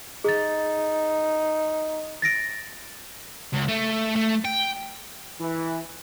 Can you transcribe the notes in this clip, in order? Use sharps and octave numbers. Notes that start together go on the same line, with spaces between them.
D#4 G#4 A6
A6 A#6 D7
C#2
A3
A3
G5
E3